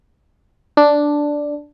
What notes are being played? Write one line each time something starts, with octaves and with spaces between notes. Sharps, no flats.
D4